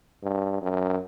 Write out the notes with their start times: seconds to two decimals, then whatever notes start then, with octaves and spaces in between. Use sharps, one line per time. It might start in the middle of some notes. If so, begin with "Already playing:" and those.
0.23 G2
0.62 F#2